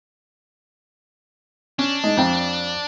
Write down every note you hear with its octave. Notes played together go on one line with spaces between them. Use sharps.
C#4 D4
G#3 D#4
F2 G5